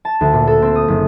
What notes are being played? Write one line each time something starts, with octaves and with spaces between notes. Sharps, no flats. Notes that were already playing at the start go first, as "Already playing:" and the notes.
A5
D2
A#2
A4
C4
D#6
F#1